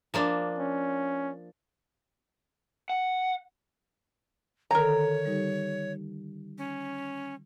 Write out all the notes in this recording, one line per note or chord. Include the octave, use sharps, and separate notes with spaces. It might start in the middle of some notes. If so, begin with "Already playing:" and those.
F3 A#3 D4
C#4
F#5
D3 D#3 A4 A#4 C#5 A#5
G3 D#4 G4
C#4